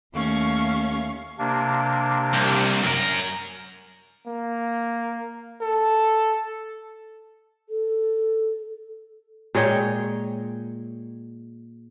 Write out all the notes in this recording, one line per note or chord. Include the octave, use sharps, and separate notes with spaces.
D#2 A3 C#4 F5 C#6
C3 A#3 D4
C2
F#2 A#4
A#3
A4
A4
A#2 G#3 C#5 G5